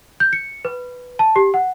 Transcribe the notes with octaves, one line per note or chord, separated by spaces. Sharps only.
G6
C#7
B4
A5
G4
F#5